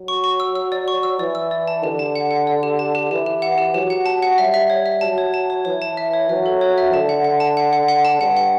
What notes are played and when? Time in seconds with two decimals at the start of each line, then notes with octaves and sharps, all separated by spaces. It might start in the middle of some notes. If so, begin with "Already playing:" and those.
Already playing: F#3
0.08 C#6
0.24 C#6
0.40 E6
0.55 E6
0.72 D5
0.88 C#6
1.03 E6
1.19 E3 D5
1.35 E6
1.51 D5
1.68 A5
1.83 D3 G4
1.99 A5
2.16 F#5
2.31 F#5
2.47 D5
2.63 G4
2.79 A5
2.95 G4
3.11 E3 G4
3.26 G4
3.42 F#5
3.58 G4
3.74 F#3 G4
3.90 F#5
4.06 A5
4.22 F#5
4.38 G3 E5
4.54 E5
4.70 C#5
4.86 E5
5.01 F#3 A5
5.18 C#5
5.34 A5
5.50 C#5
5.65 E3 C#5
5.82 A5
5.97 E5
6.14 C#5
6.29 F#3 E5
6.46 A4
6.61 C#5
6.78 E5
6.93 D3 A5
7.09 F#5
7.24 F#5
7.40 A5
7.57 F#5
7.73 F#5
7.88 F#5
8.05 A5
8.20 G2 F#5
8.37 F#5